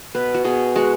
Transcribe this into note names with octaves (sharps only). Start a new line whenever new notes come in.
B2 B4
F#4
B2 G#4
G#3 F#4